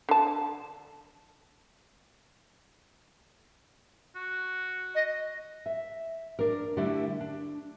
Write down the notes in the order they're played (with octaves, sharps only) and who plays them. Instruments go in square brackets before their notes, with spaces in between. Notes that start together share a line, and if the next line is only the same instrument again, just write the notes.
[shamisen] D3 A5
[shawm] F#4
[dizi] D#5
[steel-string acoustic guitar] E5
D4 A#4
D3 G3 A3 D4 E4 E5
D4